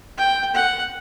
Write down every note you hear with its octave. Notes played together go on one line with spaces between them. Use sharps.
G5
F#5